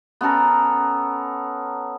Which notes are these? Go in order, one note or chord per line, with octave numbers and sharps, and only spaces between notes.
B3 C#4 A4 A#4